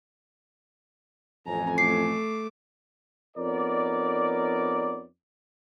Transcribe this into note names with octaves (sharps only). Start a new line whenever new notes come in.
A1 F2 G#5 A#5
A3 D6 C7
F2 B3 D#4 A#4 C#5 D5